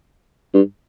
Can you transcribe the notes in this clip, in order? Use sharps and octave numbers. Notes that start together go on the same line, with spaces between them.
G2